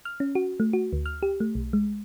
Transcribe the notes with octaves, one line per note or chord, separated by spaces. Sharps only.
F6
C#4
F#4
A3
F#4
D2
F6
G4
A3
B1
G#3